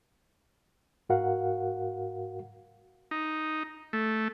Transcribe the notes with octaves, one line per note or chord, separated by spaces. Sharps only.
G#2 F#4 A#4 F5 F#5
D#4
A3